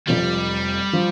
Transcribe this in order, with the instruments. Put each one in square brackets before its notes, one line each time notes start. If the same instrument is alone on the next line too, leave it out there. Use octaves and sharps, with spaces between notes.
[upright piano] F1 F2 F3 [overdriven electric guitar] G3
[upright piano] F3